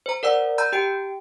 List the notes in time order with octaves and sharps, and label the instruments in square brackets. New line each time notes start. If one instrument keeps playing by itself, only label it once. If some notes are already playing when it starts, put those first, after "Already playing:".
[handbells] C5 A#5
A#4 D5 F#5 E6
A#5 B5 E6 G6
G4 G5 D7